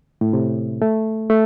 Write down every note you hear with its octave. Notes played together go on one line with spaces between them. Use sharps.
A2
C3
A3
A3